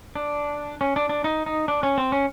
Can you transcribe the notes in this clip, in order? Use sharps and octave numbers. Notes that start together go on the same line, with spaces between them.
D4
C#4
D4
D4
D#4
D#4
D4
C#4
C4
C#4